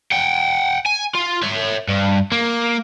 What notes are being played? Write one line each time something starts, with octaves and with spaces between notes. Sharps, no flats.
F#5 G5
G#5
F4
C#5 E5
G2
A#3